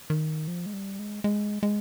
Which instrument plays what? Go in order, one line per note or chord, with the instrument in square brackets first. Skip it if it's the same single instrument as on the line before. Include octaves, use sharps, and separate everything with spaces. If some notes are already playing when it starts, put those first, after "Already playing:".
[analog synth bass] D#3
F3
G#3
G3
G#3
G#3
G#3